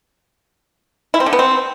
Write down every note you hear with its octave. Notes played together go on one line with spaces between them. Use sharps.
E4
C4
D3
B3
C4